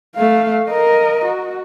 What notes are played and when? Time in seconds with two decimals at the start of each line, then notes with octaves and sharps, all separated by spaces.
0.16 A3 F5
0.70 A#4 D#5
1.25 F#4